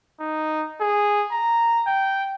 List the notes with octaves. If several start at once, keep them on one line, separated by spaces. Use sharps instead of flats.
D#4
G#4
A#5
G5